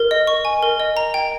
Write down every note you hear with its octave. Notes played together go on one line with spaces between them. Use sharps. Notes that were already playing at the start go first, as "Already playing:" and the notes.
Already playing: A#4
D#5
C#6
G#5
A#4
D#5
A#5
G5